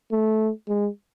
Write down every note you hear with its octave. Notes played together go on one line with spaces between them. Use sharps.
A3
G#3